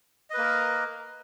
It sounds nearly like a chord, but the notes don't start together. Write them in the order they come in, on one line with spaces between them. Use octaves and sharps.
D#5 B4 A#3 A#4